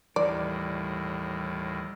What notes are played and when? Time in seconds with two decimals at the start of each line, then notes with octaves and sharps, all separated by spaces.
0.16 D#2 A2 E3 G3 D5